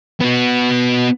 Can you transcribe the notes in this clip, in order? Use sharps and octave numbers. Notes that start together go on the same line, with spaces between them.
B3 F#4